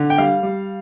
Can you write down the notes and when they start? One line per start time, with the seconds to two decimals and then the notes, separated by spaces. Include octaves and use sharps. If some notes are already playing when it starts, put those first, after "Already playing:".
Already playing: D3
0.10 G5
0.18 G3 F5
0.43 G3